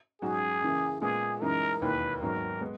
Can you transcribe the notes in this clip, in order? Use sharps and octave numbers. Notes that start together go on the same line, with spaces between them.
G#2 F#3 C#4 F#4 G#4
F#2 C#3 E3 A#3
A#2 G#3 B3 G#4
F#2 E3 G#3 D#4 A#4
E1 D#2 D#3 A#3 E4 B4
G#1 G#2 F#3 B3 A#4
G#3 B3